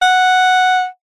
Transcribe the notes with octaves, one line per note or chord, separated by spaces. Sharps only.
F#5